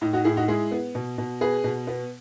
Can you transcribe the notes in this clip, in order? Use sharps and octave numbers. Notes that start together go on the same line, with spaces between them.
A2 D#4
D#4 F#4
A2 E4 G#4
D#4 F#4
G#3 E4 G#4
B3
B2
B2
B3 G#4 B4
B2
B3